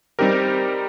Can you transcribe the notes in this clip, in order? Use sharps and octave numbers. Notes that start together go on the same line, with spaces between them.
G3 C4 D#4 G4 A#4